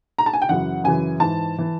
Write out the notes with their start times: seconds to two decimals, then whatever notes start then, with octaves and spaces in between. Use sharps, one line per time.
0.18 A#5
0.26 A5
0.33 G#5
0.42 G5
0.49 F#2 C#3 E3 F#5
0.84 F#2 C#3 E3 G#5
1.20 G#2 E3 A5
1.58 E3